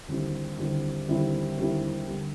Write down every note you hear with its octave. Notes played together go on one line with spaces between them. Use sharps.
D#2 D3 G3 C4 E4
D#2 D3 G3 C4 E4
D#2 D3 G3 C4 E4
D#2 D3 G3 C4 E4
D3 G3